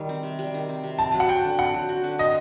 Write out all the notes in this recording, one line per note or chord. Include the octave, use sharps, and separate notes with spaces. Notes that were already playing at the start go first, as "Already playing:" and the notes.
Already playing: D#3 G3
C4
C3
G3
D#3
C4
C3
C4 A5
F#3
F#5
F#4 G5
D3
C4 F#5
F#3
F#4
D3
C4 D#5